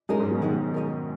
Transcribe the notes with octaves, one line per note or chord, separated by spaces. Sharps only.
F#2 G#3 D#4 A#4
G#2
B2
D#3 G#3 D#4 F#4
G#3 D#4 A#4